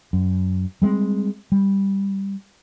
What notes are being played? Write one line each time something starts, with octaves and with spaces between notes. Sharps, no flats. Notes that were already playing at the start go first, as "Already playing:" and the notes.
F#2
G3 G#3 B3 C4
G3